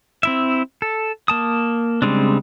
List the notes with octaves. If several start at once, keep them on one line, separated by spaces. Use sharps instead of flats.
C4 E4 E5
A4
A#3 A5 D#6
C#3 G3 G#3 C4 D4